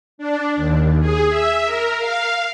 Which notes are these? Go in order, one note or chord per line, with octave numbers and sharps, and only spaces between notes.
D4
D#2
G#4
E5
A#4
F5